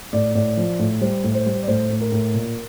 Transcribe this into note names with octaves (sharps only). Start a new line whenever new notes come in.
A2 D5
A2 D5
F3
A2
G3 C5
A2
C5
G3
D5
A2 C5
A2
A#4
A2
A#2